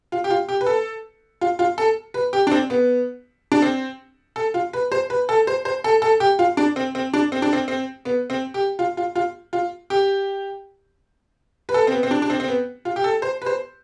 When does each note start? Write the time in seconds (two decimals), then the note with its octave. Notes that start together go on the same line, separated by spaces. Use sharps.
0.12 F4
0.24 G4
0.30 F4
0.49 G4
0.61 B4
0.67 A4
1.41 F4
1.59 F4
1.78 A4
2.14 B4
2.33 G4
2.47 D4
2.52 C4
2.70 B3
3.52 D4
3.62 C4
4.36 A4
4.54 F4
4.73 B4
4.92 C5
5.10 B4
5.29 A4
5.47 C5
5.65 C5
5.84 A4
6.02 A4
6.20 G4
6.39 F4
6.57 D4
6.76 C4
6.95 C4
7.14 D4
7.32 C4
7.42 D4
7.53 C4
7.68 C4
8.05 B3
8.30 C4
8.54 G4
8.79 F4
8.97 F4
9.16 F4
9.53 F4
9.90 G4
11.69 B4
11.74 A4
11.87 C4
11.92 B3
12.03 C4
12.11 D4
12.22 D4
12.30 C4
12.40 C4
12.48 B3
12.85 F4
12.96 G4
13.04 A4
13.22 C5
13.42 B4
13.46 C5